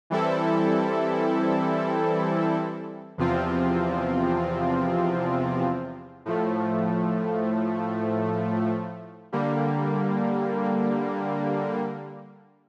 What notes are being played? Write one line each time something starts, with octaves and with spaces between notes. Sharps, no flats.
E3 G3 C4 E4 A4
E2 C3 F3 C4 F4
A2 F3 A3
D3 G3 A#3